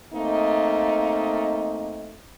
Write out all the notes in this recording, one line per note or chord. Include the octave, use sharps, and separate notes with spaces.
A3 A#3 C4 D#4 D#5